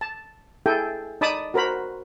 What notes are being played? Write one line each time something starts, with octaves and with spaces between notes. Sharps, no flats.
A5
E4 G#4 A4 G5 G#5
D#4 D5 A5 B5 D6 D#6
F#4 A#4 C5 B5